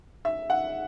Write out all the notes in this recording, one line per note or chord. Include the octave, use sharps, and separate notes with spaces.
E5
F#5